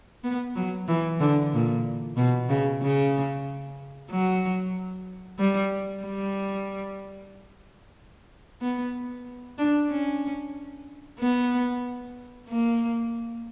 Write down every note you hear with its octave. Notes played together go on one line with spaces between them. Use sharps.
B3
F#3
E3
D3
A#2
B2
C#3
C#3
F#3
G3
G3
B3
D4
C#4
B3
A#3